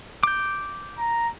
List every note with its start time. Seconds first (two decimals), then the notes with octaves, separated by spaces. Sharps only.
0.23 D6 G6
0.98 A#5